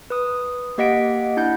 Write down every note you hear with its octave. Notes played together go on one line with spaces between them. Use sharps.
B4 D#6
A#3 G4 D#5 F#5 B6 D7
D4 E4 F#5 G6